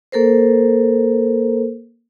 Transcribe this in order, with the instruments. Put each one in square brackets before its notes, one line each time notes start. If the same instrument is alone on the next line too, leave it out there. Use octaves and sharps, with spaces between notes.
[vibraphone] A#3 A4 A#4 C5